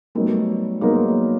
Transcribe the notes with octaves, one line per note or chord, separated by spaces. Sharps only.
F#3 G3 A3 B3 D#4 F#4 A#4
F#3 G#3 A#3 B3 D#4 F#4 A#4